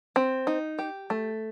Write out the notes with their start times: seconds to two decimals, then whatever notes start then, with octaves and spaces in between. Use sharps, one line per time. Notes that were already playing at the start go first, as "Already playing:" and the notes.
0.16 C4
0.47 D#4
0.79 G4
1.10 A3